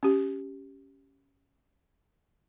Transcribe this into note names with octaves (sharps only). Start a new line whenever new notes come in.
C#4 G4